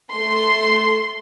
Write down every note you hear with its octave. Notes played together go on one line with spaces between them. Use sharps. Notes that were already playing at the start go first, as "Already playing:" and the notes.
A3 C6